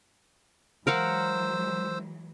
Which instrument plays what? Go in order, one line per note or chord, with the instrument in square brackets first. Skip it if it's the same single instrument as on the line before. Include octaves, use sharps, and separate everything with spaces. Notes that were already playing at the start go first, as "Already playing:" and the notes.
[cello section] E3 F#3 G#3 [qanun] A#4 F5 F#5 [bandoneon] C5 E6